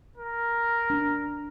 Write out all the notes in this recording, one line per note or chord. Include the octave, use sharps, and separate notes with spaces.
A#4
D4